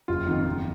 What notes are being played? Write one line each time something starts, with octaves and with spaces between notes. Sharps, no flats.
F#1 F4
F2 D#3
F#1